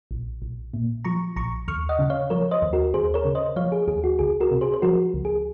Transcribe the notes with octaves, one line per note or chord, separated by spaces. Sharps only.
A#1
A#1
A#2
F3 A#5 C#6
A#1 A#5 C#6
D#2 C#6 F6
D#5 F#5
C#3
C#5 F5
F3 A#4 C#5
C5 D#5
D#2
F#4 A#4
D#2 G#4 C5
A#4 C#5
C#3
C5 D#5
F3 C#5 F5
G#4
D#2 G#4
F#4
C#2 G#4
F#4 A#4
C3
G#4 C5
C5
F3 F#4 A#4
C#2
G#4